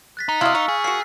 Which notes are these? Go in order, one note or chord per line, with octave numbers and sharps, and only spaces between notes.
F#6 A6 B6
D#4
C3 E4 F#4 D#5 F5 A#5 E6 F6
D#4 F5 C#6
G#4
A#3 F#4 C7